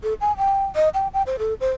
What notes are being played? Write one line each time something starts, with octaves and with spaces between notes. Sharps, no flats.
A4
G#5
G5
D#5
G5
G5
C5
A4
C5